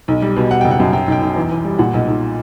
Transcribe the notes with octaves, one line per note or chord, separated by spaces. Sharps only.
B1
G3
B2
G3 F#5
F#1 G5
F#5
F#2
F#3 G5
B1 G5
B1
E2
E2
G3
A#2 F#5
B1
B1